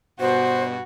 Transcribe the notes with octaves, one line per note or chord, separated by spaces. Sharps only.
G2 B2 F#4 C5